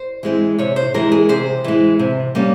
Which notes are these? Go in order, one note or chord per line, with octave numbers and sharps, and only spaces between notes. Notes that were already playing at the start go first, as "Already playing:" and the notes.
Already playing: C5
E3 G#3 C4
C3 C#5
C5
E3 G#3 A#4
G#4
C3 C5
E3 G#3
C3
G3 A#3 C#4